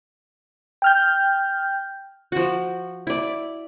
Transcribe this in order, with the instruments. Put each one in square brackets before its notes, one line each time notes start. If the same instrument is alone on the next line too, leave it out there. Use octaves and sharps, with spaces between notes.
[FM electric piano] G5 F6 G6
[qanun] F3 F#4
E4 D5